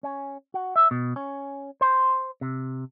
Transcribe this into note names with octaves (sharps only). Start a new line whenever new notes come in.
C#4
F#4
E5
B2
C#4
C5
C3